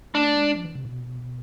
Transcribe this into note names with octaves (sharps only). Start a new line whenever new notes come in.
A3 D4
G#3
F3
E3
C3
B2